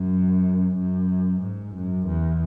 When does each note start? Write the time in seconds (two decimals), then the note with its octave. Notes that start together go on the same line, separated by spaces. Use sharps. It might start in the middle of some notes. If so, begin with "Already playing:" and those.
Already playing: F#2
0.77 F#2
1.42 G#2
1.75 F#2
2.07 E2